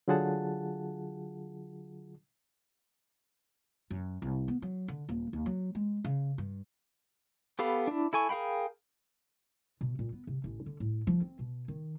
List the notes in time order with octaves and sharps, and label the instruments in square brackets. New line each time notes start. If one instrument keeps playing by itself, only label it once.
[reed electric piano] D3 F#3 F4 G#4 F#5 A5
[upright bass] F#2
C2
B3
F#3
D3
D#1
D#2
F#3
G#3
C#3
G2
[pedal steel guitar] B3 G4 A4 F5 B5
D4 E4
E4 A4 G#5 C#6
G#4 A#4 F5 G5 B5
[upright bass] B2
A#2
B3
C3
A1
D3
A2
F3
C4
B2
D#3